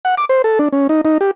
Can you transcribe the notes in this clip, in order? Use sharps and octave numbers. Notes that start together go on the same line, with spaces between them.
F#5
D6
C5
A4
D4
C#4
D#4
D#4
G4